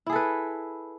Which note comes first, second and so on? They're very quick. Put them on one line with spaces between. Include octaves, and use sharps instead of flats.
E4 G#4 A4 B4